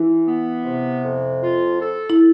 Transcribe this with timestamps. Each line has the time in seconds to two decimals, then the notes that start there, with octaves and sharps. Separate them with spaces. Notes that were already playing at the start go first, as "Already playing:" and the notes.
Already playing: E3 E4
0.26 B3
0.65 C3
1.04 F2
1.43 F4
1.81 A4
2.10 E4